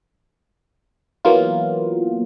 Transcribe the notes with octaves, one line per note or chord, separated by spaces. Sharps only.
E3 F#3 A#3 B3 F4